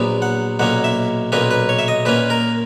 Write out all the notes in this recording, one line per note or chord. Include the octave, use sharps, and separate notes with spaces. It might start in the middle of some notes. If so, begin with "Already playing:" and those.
Already playing: A#1 A#2 F#3 B3
F#5
B1 A#2 A#3 C#4 F#5
E5
B1 A#2 A#3 C#4 B4
B4
C#5
E5
D#5
A#2 A#3 C#4 B4
A#4